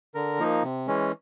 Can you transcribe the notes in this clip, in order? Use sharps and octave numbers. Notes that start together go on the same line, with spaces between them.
D3 A#4
F3 A#3 D#4
C3
E3 G#3 C#4